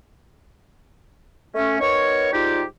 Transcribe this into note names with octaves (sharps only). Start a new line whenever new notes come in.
A3 C#4
B3 D#4 A#4 C#5
G#2 G3 D#4 F4 G4